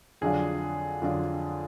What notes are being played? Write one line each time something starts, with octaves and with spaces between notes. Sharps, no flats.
F2 D3 F#3 D4 F4 G#4
F2 D3 F#3 D4 F4